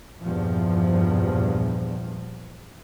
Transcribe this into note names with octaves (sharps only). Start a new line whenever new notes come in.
E2 G2 A#2 F3